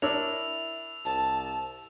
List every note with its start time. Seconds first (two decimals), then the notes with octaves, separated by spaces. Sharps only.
0.02 D4 E4 A#4 C#5 E6 F7
1.05 C2 A5